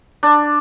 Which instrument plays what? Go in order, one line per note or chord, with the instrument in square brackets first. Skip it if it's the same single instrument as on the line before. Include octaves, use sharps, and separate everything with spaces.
[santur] D4